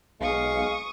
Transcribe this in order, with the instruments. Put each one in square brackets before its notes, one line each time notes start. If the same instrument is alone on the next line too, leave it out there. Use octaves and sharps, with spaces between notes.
[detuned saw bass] B1 [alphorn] G#3 [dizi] F5 [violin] C#6 D#6